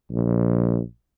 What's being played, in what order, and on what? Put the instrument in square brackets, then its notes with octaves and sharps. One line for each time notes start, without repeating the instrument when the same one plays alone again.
[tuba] A#1